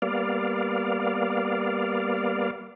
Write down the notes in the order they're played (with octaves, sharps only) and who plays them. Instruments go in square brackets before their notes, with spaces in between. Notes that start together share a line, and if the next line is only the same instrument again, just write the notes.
[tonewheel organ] G3 A#3 B3 D5 F5